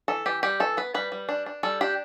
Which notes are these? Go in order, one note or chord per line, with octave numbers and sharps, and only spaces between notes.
E3 A4
E3 G4
G3 G4
E3 A4
B3 B4
G3 B4
G3
D4
D4
G3 A4
D4 G4